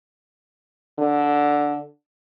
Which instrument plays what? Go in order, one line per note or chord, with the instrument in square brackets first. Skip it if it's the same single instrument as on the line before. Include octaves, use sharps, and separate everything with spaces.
[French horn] D3